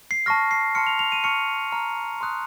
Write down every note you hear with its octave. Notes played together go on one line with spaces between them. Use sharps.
C7
A5 C#6 F6 A#6
C7
A5 C6 F6 C#7
F7
F7
D#7
A5 C#6 F6 C#7
A#5 F6
C6 D#6 F#6